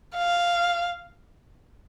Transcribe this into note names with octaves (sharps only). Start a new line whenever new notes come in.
F5